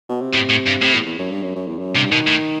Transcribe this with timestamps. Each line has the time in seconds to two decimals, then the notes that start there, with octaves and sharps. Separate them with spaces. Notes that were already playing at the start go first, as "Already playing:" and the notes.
0.09 B2
0.21 C3
0.33 A2
0.49 A2
0.66 G2
0.82 A2 C3
0.95 E2
1.06 E2
1.19 F#2
1.31 G2
1.43 F#2
1.55 F#2
1.68 E2
1.79 F#2
1.96 G2 C3
2.11 B2 D#3
2.27 A2